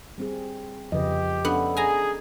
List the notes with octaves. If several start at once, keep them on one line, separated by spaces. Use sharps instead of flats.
G3 C4 G#4
F2 C#3 F3 G4 B4 D#5
B3 C#4 D4 A4
G#4 G#5 A#5